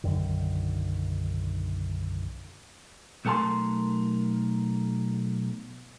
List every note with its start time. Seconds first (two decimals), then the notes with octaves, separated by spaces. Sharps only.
0.04 B1 F#2 D3 D#3
3.25 B1 A3 B3 A#4 A5 C6